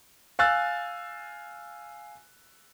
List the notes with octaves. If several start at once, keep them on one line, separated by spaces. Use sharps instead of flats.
F5 G#5 E6 F#6 A6